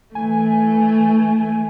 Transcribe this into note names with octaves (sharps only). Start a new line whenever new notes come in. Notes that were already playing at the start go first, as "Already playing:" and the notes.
E3 A3 G#5